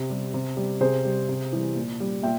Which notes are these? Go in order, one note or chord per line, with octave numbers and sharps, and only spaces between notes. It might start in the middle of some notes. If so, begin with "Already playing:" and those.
Already playing: C3
G3
C3
G3
C3 G#4 C5
G3
C3
E3 G3
A#2
G3
A#2 E5 G5